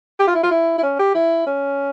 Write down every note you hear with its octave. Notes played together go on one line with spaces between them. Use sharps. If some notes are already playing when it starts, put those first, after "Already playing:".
G4
F4
E4
F4
E4
E4
C#4
G4
E4
C#4